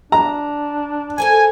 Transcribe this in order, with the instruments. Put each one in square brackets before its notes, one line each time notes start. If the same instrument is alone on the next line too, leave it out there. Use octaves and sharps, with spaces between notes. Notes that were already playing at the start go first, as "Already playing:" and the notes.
[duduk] D4 [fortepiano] A#5
[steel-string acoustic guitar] A4 A#4 C5 [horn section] G#5